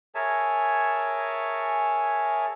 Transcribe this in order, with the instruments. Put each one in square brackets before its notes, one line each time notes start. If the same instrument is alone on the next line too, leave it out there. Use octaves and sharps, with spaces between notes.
[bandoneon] G#4 A#4 C#5 E5 G#5 A5